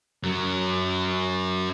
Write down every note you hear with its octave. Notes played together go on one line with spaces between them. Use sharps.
F#2 F#3